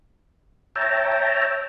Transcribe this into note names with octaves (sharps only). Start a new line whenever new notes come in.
C#5 E5 G5 A5 A#5